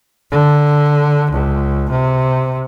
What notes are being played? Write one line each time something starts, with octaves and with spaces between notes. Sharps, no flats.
D3
C#2
C3